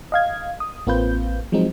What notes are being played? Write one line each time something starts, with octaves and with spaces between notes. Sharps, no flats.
D#5 F5 G#6
D#6
A1 A#3 C4 F4 B4 G6
F3 F#3 G#3 C4 D#4